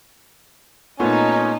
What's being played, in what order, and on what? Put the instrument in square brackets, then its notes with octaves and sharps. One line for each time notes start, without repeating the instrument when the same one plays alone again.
[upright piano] A#2 A3 B3 [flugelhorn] C#4 [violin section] D#4 D#5 A5